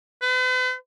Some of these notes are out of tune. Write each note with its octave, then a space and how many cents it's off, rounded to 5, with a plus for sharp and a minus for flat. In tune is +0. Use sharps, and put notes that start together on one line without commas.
B4 +45